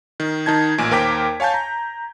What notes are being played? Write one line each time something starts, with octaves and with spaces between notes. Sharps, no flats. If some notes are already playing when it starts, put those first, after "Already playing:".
D#3
D#3 D#4 A5 G#6
A1 A#2 G#5 D7
D#2 A#4 C5 G5 D6 B6
C#5 F5 G#5 A5 G6
A#5